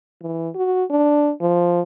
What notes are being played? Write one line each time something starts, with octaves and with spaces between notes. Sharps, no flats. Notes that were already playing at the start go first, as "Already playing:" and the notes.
E3
F#4
D4
F3